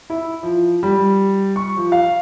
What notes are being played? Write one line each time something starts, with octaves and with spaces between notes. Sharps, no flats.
E4
F3
G3
C#6
F3
F5